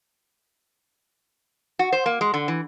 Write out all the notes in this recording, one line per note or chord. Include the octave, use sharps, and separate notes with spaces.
F#4
C5
A#3
G#3
D3
E3